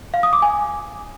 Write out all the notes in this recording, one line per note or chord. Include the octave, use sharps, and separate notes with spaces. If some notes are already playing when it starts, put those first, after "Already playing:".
F5
D#6
D6
G#5